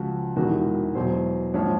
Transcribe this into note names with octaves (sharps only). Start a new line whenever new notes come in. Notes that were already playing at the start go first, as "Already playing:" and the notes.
Already playing: C#2 C#3 F3 F#4
E1 E2 C3 D#3 F#4
E2 B2 F#3 C5
A#1 G#2 F3 C#5